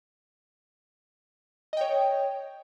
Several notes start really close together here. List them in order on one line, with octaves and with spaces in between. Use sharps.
D#5 G5 C#5